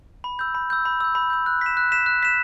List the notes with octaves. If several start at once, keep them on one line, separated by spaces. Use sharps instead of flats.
B5
E6 G6
B5
E6 G6
B5
E6 G6
B5
E6 G6
F#6
B6 E7
F#6
B6 E7
F#6
B6 E7